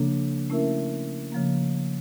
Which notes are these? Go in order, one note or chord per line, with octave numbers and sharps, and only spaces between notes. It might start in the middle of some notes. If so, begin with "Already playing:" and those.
Already playing: C#3 F3 A#3 D4 A4
A3 C#4 E4 A#4 E5
C#3 F3 A#3